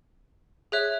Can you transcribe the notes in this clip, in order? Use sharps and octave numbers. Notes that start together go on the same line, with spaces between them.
G#4 C#5 E5 F#6